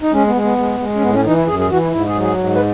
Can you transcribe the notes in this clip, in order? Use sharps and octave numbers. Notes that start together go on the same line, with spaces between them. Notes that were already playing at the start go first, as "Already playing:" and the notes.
D#4
G#3 C#4
B3
G#3
B3
G#3
G#3
C#4
A2 B3
C#4
E3 D#4
E4
F#2 G#4
G#4
E3 F#4
E4
G#2 E4
G#4
F#3
G#4
G#2
B4